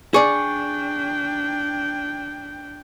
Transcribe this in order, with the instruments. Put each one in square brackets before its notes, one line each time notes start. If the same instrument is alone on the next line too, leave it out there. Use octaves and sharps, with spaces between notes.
[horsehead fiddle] D4 G5 [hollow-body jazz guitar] G#4 D5 [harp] C#6